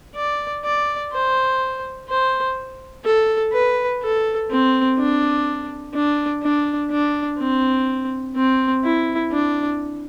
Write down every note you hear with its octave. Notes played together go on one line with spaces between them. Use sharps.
D5
D5
C5
C5
A4
B4
A4
C4
D4
D4
D4
D4
C4
C4
E4
D4